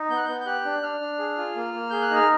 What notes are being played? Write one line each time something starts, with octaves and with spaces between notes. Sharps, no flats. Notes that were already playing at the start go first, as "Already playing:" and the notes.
Already playing: D#4
B3 G6
F#6
B3 G6
G6
G4 F#6
D4
D4 F6
D4
G#4
F4
A#3
A#3
G#4 G6
F#6
D#4
F6